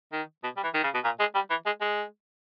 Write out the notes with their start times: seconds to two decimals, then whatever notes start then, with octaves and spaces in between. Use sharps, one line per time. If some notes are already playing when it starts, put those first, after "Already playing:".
0.12 D#3
0.44 B2
0.57 G3
0.63 E3
0.74 D#3
0.84 C#3
0.94 B2
1.04 A#2
1.20 G#3
1.35 G3
1.50 E3
1.66 G#3
1.81 G#3